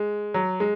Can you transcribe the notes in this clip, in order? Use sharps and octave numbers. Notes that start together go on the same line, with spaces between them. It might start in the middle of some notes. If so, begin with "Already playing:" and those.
Already playing: G#3
F#3
G#3